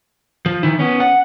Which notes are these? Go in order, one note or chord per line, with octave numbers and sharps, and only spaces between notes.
F3
D#3 E4
B3 C#4
F#5